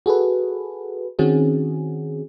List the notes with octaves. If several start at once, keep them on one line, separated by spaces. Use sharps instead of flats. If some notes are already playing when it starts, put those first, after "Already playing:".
F#4 G#4 A4 B4
D#3 C4 C#4 F#4 G#4